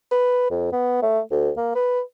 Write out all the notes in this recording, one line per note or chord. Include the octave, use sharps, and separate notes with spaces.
B4
F2
B3
A3
D2
A#3
B4